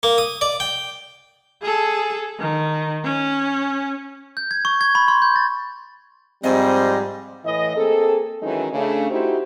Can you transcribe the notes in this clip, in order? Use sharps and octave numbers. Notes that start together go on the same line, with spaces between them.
A#3
D#6
D5
G5
G#4 A4
D#3
C#4
G6
G#6
C#6
G#6
B5
C6
G6
A6
G#2 F3 G3 C4 D#5
A2 E3 D#5
A#3 C4 G#4 A4
D#3 E3 F#3 G#3 C#4 D#4
C#3 A3 D4
D#4 E4 F#4 G4 C5